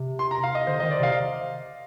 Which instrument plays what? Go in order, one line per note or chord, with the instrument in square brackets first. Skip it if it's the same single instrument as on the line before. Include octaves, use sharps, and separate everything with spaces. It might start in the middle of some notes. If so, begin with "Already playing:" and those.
Already playing: [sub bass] C3
[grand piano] C6
A#5
F5
D#5
[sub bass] D3 [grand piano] C5
[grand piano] D#5
[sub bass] D#3
[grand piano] D5
[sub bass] C3 [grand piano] F5